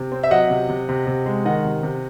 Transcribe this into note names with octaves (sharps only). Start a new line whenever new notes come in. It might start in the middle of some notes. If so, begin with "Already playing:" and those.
Already playing: C3
C4
E5
F#3 D#5 F#5
C3
C3
C3
C3
G#3
D#3 D#5 F#5
C3
C3